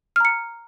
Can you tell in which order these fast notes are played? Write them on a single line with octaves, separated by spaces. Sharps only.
F6 A#5 C#7